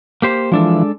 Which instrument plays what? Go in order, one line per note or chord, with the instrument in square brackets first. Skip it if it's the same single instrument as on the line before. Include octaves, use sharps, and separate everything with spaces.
[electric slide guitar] A#3 G4 C5
[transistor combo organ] E3 F3 [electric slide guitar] G#3 D4 A4